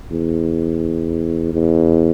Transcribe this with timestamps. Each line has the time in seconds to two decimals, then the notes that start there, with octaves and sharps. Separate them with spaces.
0.11 E2
1.53 E2